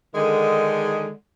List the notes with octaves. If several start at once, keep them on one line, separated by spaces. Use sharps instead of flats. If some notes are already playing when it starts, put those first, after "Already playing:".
D3 D#3 G#3